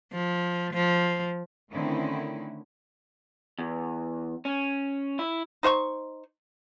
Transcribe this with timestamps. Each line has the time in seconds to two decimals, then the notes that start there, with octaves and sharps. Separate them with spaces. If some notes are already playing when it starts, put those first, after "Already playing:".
0.13 F3
0.74 F3
1.71 D3 D#3 A3 C4 C#4 E4
3.59 E2
4.45 C#4
5.19 E4
5.63 D#4 C5 F#5 C#6